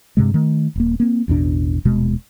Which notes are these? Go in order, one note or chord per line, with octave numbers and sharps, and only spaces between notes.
G2 C3 G#3
D#3 A3
D#1 A#3
A#3 C4
A1 E2 B2 D4
D#1 B2 G#3